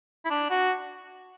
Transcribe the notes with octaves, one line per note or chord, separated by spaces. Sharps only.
E4
D4
F#4